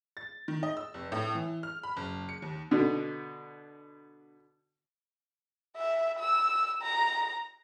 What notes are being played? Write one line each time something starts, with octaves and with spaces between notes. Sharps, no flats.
A6
D#3
D#5
E6
F1
A2
E3
F6
B5
F#1
C#7
D#2
B2 D3
E5
E6
A#5